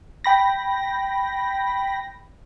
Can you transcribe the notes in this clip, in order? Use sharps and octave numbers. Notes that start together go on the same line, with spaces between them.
G5 B5 A#6